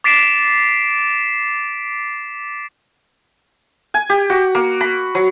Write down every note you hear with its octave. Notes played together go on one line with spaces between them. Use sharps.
D6 A6 B6 C7 D7 E7
G#5
G4
F#4
A#3
B5
F#3